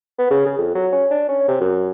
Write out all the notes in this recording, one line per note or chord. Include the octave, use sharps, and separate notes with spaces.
B3
C#3
C#3
F2
F#3
C#4
D4
C#4
C3
F#2